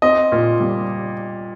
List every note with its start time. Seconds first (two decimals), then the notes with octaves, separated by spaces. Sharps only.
0.02 C4 D#5
0.32 A#2
0.60 G3